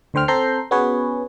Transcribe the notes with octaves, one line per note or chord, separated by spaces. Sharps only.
D2 D3 C5 G5 F6
C4 A4 C5 A#5 G6 C7
B3 C#4 F#4 G#4 B4 C#5